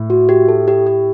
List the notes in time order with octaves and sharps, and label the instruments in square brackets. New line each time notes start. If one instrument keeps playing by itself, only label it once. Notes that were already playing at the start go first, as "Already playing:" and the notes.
Already playing: [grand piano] A2
[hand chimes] F#4
G4
A4
G4
G4